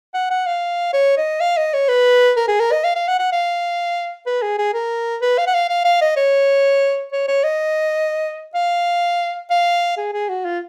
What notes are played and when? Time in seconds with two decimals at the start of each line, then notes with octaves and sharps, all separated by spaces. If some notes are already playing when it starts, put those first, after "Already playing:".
0.14 F#5
0.30 F#5
0.46 F5
0.93 C#5
1.17 D#5
1.41 F5
1.57 D#5
1.74 C#5
1.88 B4
2.37 A#4
2.48 G#4
2.60 A#4
2.72 D#5
2.84 F5
2.96 F5
3.08 F#5
3.19 F#5
3.32 F5
4.26 B4
4.42 G#4
4.58 G#4
4.74 A#4
5.22 B4
5.38 F5
5.47 F#5
5.54 F5
5.69 F5
5.85 F5
6.01 D#5
6.17 C#5
7.13 C#5
7.28 C#5
7.44 D#5
8.55 F5
9.50 F5
9.97 G#4
10.13 G#4
10.29 F#4
10.45 F4